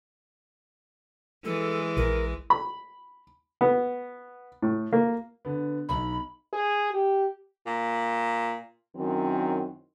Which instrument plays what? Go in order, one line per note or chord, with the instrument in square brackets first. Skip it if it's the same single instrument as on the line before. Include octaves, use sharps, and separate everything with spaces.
[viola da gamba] E3 G#3 [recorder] A4
[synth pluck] A#1 [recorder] A#4
[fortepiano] B5
B3
A2
A#3
[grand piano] D3 B3
[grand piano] B1 D#4 [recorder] B5
[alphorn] G#4
G4
[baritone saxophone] A#2
[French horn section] F#2 D#3 C4 C#4 E4